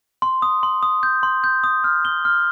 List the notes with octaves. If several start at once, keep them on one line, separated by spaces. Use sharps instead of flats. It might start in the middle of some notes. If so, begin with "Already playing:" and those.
C6
D#6
C6
D#6
G6
C6
G6
D#6
F6
G7
F6